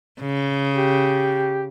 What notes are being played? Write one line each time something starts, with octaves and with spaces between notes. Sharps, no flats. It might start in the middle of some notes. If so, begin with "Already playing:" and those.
C#3
G4